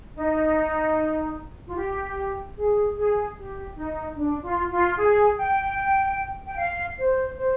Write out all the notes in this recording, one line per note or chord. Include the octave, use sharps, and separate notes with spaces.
D#4
F4
G4
G#4
G#4
G4
D#4
D4
F4
F4
G#4
G5
G5
F5
C5
C5